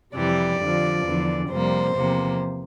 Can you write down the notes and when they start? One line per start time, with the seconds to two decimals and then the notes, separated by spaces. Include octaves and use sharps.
0.13 F2 C3 E3 G3 D5
0.59 F2 D3 F3
1.04 E2 D3 F3
1.49 F2 C3 G3 A#3 C5
1.94 E2 C3 F3 A#3